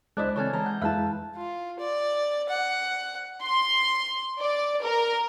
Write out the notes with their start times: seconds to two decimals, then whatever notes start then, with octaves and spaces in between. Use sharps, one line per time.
0.17 C#2 G#3 D4 E4 C5 D5 D#5 F#6
0.36 C#3 E3 C4 A4 C#5 G#5 F6
0.53 E3 G#3 A5 A#5
0.66 F#5 G6
0.81 F2 G#3 E4 B4 E5 F5 A5
1.36 F4
1.79 D5
2.49 F#5
3.42 C6
4.40 D5
4.84 A#4